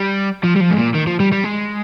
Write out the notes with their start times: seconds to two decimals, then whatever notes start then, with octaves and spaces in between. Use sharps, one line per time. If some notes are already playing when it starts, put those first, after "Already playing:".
Already playing: G3
0.44 F3
0.56 G3
0.61 F3
0.71 G#2
0.78 A#2
0.95 D#3
1.07 F3
1.20 G3
1.32 G3
1.44 G#3